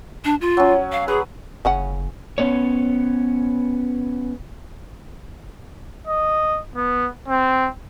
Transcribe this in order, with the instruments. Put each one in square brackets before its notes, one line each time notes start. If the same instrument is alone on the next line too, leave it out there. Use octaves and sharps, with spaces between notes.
[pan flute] D4
F4
[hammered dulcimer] F#3 C#4
[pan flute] F5
[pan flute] G#4 [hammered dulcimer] B4
[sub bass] F#1 [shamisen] C#3 C#4 F#5
[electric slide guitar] B3 C#4 C#5
[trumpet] D#5
B3
C4